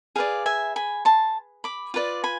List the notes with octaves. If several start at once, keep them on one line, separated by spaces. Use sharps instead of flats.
G#4 B4 D5 F5
E5 G#5
G#5 B5
A5 C6
B5 D6
F4 B4 D5
G#5 B5